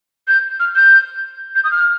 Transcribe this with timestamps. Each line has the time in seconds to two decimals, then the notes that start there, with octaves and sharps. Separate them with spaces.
0.28 G6
0.60 F6
0.76 G6
1.55 G6
1.64 D#6
1.71 F6